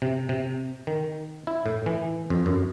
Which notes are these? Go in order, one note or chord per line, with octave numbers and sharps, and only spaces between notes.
C3
C3
D#3
E4
A2
E3
F2
F#2